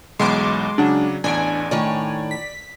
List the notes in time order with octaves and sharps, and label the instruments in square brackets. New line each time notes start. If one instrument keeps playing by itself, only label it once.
[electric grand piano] B1 E2 B5 [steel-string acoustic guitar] G#3 [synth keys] C6 D6
[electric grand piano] C#3 F#3 F#5 [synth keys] D4
[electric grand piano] A1 E2 D7 [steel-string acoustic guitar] D4 [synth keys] G#5
[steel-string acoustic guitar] A2 D#3 C#5 [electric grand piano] D5
[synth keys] B6